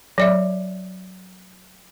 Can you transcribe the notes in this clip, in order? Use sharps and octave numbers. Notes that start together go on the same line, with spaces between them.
F#3 D5 E5